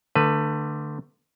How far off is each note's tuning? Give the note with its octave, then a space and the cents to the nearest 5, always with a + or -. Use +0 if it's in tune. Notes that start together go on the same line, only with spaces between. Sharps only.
D3 +15 A3 +20 B4 +0